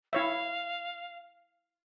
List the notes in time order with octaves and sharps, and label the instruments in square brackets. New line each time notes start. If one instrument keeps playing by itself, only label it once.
[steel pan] E4 C#5 E5 [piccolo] F5